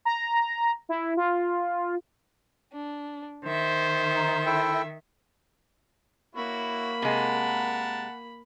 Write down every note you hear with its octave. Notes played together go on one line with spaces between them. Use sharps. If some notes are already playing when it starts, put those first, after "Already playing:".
A#5
E4
F4
D4
D#3 C5 E5
D#4
E4 A4 G5
A#3 E4 F#4 C#5 B5
C3 G#3 A#4 F#5 A5